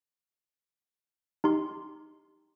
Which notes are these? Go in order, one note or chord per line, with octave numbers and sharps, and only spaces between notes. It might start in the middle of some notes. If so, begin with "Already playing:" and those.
D#4 G4 C6